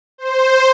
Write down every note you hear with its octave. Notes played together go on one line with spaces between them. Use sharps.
C5